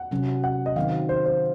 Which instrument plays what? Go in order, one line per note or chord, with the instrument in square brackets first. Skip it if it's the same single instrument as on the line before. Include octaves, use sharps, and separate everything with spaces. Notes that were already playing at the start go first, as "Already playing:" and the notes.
Already playing: [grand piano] F#5
[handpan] C3 F#3 C#4
[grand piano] F#5
D#5
[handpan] D#3 F#3 C4 [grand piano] F5
[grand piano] C5
C5